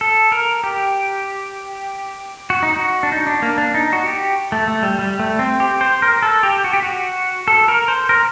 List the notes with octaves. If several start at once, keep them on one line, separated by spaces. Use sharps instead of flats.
A4
A#4
G4
F#4
D#4
F#4
D4
D#4
D4
A#3
D4
D#4
F#4
G4
A3
A3
G3
G3
A3
C4
G4
C5
A#4
A4
G4
F#4
G4
F#4
A4
A#4
C5
A#4